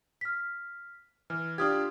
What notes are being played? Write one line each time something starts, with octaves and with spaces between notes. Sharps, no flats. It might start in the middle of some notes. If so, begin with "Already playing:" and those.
F6 B6
E3 F6
D4 F4 G4 D#6 F6 G#6